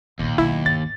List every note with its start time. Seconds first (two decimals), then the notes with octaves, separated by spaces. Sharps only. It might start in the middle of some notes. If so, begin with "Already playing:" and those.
0.19 A#1 D#2 A#2
0.38 B1 E4
0.66 G1 A6